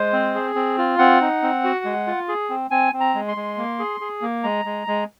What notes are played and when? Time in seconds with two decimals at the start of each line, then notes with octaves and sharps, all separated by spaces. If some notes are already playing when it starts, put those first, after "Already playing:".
Already playing: G#3 C5
0.13 C4
0.34 G#4
0.55 C4
0.78 F4
0.99 C4 F#5
1.21 D#4
1.42 C4
1.64 F#4
1.85 G#3
2.07 F4
2.28 G#4
2.50 C4
2.71 C4 G#5
2.93 C4
3.00 A#5
3.15 G#3
3.28 C6
3.36 G#3
3.58 A#3
3.79 G#4
4.00 G#4
4.22 A#3
4.44 G#3 A#5
4.65 G#3
4.87 G#3